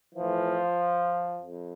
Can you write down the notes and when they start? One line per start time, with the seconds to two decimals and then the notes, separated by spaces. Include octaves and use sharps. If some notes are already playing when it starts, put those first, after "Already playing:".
0.15 A2 E3 F3
1.42 F2